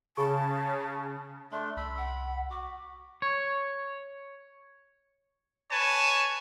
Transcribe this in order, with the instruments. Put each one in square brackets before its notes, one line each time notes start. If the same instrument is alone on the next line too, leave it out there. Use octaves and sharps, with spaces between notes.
[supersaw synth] C#3 [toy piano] G#4 C#6 [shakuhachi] A5
[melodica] A3 D4 [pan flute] C6
[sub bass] C2 [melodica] B5 [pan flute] E6
[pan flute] F#5
[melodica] F#4 [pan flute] D6
[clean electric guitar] C#5
[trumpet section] B4 C#5 G#5 A5